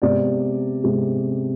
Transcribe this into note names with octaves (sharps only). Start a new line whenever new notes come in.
C3 G#3 B3 D5
C3 G#3 B3